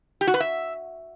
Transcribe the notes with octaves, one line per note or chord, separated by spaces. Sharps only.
G4
F#4
B4
E5